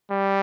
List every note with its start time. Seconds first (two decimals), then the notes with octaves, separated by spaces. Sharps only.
0.11 G3